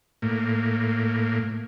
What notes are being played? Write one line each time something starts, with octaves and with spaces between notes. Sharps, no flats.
A2 A#3